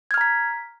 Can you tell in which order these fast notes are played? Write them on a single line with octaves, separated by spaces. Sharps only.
G#6 F6 A#5 B6